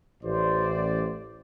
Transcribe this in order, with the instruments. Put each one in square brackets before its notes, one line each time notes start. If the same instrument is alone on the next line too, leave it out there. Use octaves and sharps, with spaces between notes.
[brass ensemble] A1 C5 D5